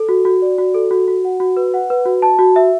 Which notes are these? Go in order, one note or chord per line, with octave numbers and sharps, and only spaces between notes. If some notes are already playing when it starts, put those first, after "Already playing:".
Already playing: A4
F#4
F#4
D5
F#4
A4
F#4
F#4
F#5
F#4
B4
F#5
B4
F#4
A5
F#4
E5